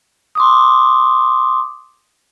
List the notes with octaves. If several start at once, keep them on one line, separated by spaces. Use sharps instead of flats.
C6 D6 D#6